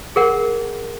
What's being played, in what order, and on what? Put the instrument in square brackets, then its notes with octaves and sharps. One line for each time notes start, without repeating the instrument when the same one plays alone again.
[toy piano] G#4 A#4 F#5